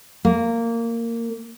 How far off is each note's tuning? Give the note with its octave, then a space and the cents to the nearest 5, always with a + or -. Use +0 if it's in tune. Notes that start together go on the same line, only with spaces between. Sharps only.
A#3 -15